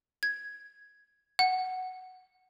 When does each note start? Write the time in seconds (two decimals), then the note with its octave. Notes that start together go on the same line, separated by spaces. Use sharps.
0.23 G#6
1.39 F#5